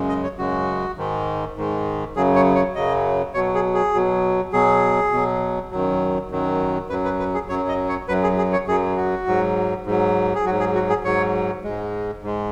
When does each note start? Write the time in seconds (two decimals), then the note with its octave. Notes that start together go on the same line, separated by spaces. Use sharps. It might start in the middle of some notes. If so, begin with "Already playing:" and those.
Already playing: F#2 C#3 G#3
0.09 D#5
0.23 C#5
0.38 F#2 C#3 G#3 F#4
0.97 G#2 D#3 G#3
1.57 G#2 D#3 G#3
2.16 F#2 C#3 F#3 G#4
2.35 C#5
2.55 C#5
2.75 F#2 C#3 F#3 D#5
3.34 B2 F#3 C#5
3.54 G#4
3.74 G#4
3.94 B2 F#3
4.53 B2 F#3 G#4
5.12 B2 F#3
5.71 F#2 D#3 F#3
6.31 F#2 D#3 F#3
6.90 F#2 F#3 B4
7.05 B4
7.19 B4
7.34 G#4
7.49 F#2 F#3 C#5
7.68 D#5
7.89 C#5
8.08 F#2 F#3 B4
8.23 G#4
8.38 G#4
8.53 C#5
8.68 F#2 F#3 G#4
8.97 F#4
9.27 G#2 F#3
9.86 G#2 F#3
10.35 G#4
10.45 F#3 F#4
10.50 G#2
10.60 G#4
10.75 F#4
10.89 G#4
11.04 G#2 F#3 C#5
11.64 G#2 G#3
12.23 G#2 G#3